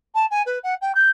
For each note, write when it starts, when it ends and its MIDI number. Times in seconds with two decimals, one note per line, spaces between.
0.15 0.26 81
0.31 0.42 80
0.46 0.59 71
0.63 0.74 78
0.81 0.95 79
0.95 1.10 91